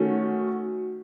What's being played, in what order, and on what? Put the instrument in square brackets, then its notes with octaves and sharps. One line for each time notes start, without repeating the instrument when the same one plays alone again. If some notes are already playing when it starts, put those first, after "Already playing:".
Already playing: [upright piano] D#3 A3 C#4 [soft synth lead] F#4